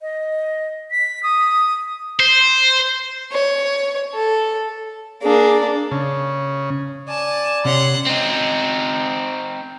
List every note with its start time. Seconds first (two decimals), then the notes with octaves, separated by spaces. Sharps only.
0.01 D#5
0.91 B6
1.23 D#6
2.20 C5
3.32 C#5
4.14 A4
5.23 A#3 D4 G#4
5.91 C#3
7.08 D5 G#5 A5
7.65 C3 C#4 C#5 F#5 C6
8.07 C4 D#4